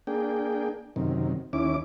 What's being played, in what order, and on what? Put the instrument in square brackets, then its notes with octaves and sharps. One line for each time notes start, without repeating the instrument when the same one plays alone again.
[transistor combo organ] A#3 D4 G#4 G5
F#2 C3 D#3
D#2 C#4 E4 D6